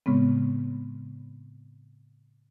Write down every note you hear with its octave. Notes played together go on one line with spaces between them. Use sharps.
A2 C#3 G#3 B3 C4